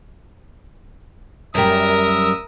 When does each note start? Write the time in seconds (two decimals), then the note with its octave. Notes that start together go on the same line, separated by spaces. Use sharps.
1.55 F#2 G3 A#4 E5 D#6 E6